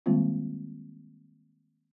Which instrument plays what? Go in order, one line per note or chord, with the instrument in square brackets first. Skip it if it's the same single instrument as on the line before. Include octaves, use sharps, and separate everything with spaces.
[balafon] D#3 G3 G#3 A#3 C4 F4